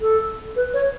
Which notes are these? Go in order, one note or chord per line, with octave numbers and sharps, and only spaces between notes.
A4
B4
C#5